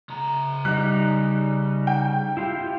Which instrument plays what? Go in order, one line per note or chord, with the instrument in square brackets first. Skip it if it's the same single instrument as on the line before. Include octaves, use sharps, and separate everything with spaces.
[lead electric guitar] C#3 A#5
[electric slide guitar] G3 D#4 [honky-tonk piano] F#6
[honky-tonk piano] G5
[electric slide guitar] E4 F4 G4